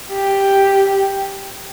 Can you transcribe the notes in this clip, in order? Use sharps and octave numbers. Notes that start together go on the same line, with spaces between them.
G4